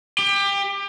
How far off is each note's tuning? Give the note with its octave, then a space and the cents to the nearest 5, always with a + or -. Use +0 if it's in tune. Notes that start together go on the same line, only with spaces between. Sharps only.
G4 +25